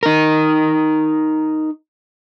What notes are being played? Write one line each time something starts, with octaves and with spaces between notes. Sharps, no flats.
D#4 A#4